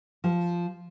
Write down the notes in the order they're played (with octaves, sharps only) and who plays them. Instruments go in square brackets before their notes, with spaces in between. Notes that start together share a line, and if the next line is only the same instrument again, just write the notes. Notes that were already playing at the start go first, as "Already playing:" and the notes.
[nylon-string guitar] F3